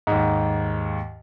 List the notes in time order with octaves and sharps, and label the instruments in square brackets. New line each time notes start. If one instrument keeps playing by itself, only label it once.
[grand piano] D#2 G#2